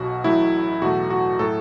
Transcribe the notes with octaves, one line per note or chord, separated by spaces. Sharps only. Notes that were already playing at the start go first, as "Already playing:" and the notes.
Already playing: B1 B2 F#3 F#4
A1 A2 F#3 A3 E4
E2 B2 F#3 A3 F#4
F#4
A2 F#3 A3 A4